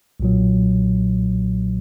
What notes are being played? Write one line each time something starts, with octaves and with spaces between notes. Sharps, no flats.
B1 A#2 F#3